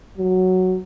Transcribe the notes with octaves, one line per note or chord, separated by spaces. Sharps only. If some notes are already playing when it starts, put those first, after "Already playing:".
F#3